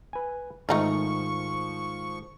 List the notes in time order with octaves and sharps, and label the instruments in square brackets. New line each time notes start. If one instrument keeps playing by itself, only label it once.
[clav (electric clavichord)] B4 G#5
[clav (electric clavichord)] G#2 D#3 [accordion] F3 C#6 [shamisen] A3 D#4 F4